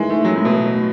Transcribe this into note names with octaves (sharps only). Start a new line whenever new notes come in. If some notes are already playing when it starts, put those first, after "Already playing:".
Already playing: D#3 E3 G#3
A3
F#3
A2
B2